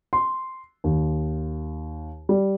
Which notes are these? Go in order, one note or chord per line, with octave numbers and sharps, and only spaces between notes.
C6
D#2
G3